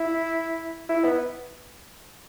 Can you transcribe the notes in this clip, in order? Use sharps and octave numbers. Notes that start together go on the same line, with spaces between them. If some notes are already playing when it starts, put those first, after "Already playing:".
Already playing: E4
E4
B3